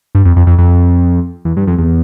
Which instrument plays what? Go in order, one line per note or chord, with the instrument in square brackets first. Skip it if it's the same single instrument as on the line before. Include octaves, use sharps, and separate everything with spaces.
[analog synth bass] G2
F2
F2
F2
F2
E2
G2
F2
E2